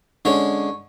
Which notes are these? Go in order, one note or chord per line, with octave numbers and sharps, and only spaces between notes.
D3 G#3 C#4 C#5